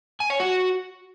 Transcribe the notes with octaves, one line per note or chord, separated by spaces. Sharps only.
G#5
C#5
F#4